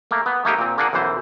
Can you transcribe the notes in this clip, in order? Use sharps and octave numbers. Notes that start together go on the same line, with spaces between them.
A3 A#3
B3
A3 A#3 D#4 G4
A#2 C4
A#3 D4 G#4 F#5
B1 F#2 E3 C5